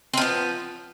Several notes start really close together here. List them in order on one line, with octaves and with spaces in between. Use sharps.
C4 F3 B3